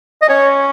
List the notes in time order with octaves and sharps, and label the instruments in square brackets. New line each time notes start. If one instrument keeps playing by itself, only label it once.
[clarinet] D#5
[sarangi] C#4 [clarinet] C#5